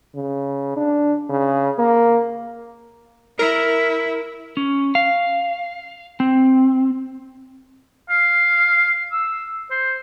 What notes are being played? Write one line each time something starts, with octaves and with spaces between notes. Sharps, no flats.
C#3
D4
C#3
A#3
E4 A#4
C#4
F5
C4
F5
E6
C5